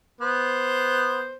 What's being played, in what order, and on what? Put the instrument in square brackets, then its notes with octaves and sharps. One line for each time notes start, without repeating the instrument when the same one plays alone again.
[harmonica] B3 C5